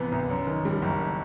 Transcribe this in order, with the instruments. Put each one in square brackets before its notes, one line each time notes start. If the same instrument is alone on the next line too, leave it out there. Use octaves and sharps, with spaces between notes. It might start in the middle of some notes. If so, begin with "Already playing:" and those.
Already playing: [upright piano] C2 C3 E3 B3
C2
F#2
D#3
G3
F#1